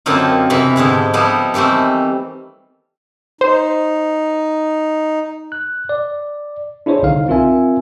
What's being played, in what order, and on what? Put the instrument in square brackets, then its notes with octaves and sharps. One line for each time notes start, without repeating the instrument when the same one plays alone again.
[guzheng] F#2 D3 A#3 C4 D#4 F4
E2 C3 E3 A#5 B5
G#2 D3 B3 E4
F3 G3 B3 D#4 E4
D#3 E3 G3 A3 C4
[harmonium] D#4 [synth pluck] C5
[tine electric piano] F#6
D5
D4 E4 G#4 C5 C#5
C2 D3 D#3 D#4 F5
C4 F4 A#4 E5 G#5